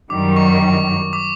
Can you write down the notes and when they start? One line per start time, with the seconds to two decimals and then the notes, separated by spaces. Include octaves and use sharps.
0.10 F#2 D#3 G3 D6
0.36 C#6
0.62 C#6
1.13 D6